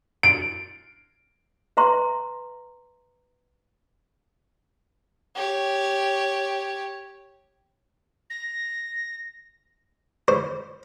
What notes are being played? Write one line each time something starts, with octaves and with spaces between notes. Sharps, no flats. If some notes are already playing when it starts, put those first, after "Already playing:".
D7
B4 E5 A#5 C6
G4 C#5
A#6
C5